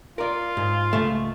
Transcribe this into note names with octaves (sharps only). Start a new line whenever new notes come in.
F4 A#4 D5
G#2
C#2 A3